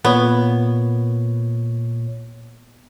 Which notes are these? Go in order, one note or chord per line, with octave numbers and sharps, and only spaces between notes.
A#2 B3 C#5